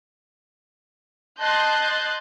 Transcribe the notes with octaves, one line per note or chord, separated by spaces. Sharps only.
D#5 A5 C6 F#6 G6 A6